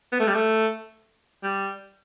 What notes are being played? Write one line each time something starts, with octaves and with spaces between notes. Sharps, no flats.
B3
A3
G3
A3
G3